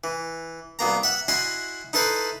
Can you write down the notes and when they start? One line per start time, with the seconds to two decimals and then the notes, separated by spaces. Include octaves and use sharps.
0.04 E3
0.79 C2 B2 A#3 A#5
1.03 E5 F#5
1.28 E4 F#4 D#5 G#5 C6
1.93 D#4 E4 A4 B4 C5